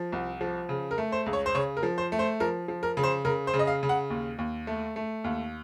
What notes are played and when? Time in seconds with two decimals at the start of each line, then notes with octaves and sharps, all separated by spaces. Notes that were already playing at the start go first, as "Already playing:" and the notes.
Already playing: F3
0.13 C2
0.41 F3
0.69 C#3
0.91 A#4
0.98 A3
1.12 C5
1.26 C#2
1.33 C#5
1.46 C5
1.55 C#3 C#5
1.77 A#4
1.83 F3
1.98 C5
2.12 A3
2.19 C5
2.40 F3 A#4
2.68 F3
2.83 A#4
2.97 C#3
3.03 C5
3.25 C#3 A#4
3.47 C5
3.54 C#3
3.59 D#5
3.67 F5
3.83 C#3
3.89 F#5
4.10 D#2
4.38 D#2
4.67 A3
4.96 A3
5.24 D#2